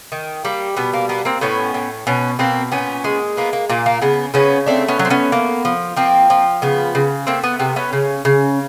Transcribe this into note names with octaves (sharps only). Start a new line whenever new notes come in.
D#3
G3 A#3
B2 B3
A#3
A#3 B3
A#3 C4
A2 B3 C#4
A2
B2 B3 C#4
B2 A#3 C4
A#2 B3 C#4
G#3
A#3 B3
A#3
A#2 A#3
A#3
C#3 B3
C#3 B3 C#4
A3 C4 D4
B3 C#4
F#3
C4
B3 C#4
A#3
F3
F3 A#3 C4
F3
C#3 B3
C#3
A3 A#3 C4
B3
C3 B3
B3 C#4
C#3
C#3